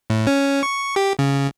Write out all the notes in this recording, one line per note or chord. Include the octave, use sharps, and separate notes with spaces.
A2
C#4
C#6
G4
C#3